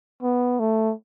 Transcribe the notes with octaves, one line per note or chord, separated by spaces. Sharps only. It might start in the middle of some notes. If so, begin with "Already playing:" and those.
B3
A3